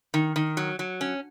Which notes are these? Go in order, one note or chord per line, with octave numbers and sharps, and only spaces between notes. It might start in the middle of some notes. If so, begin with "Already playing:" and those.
D#3
D#3
F#3
F#3
C#4